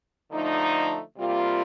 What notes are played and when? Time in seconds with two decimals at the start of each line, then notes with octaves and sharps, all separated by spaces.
0.30 D3 F3 A3 D#4
1.17 C3 G3 A#3 F4